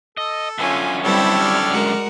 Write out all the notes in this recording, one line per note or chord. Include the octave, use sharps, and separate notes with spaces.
A4 D#5
F#2 D3 C#4 F4 G#5
G3 C4 E4 G4 A4 B4 C#5
D5 F6
G#3 F#4 A#4